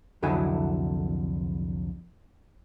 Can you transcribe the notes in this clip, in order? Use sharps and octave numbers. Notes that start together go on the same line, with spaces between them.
C2 F2 D3 F#3 E4 G#5